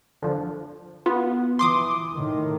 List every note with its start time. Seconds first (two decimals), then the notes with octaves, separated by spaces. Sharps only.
0.22 D3 F3
1.06 B3 F4
1.59 E3 C6 D6 D#6
2.14 A2 D#3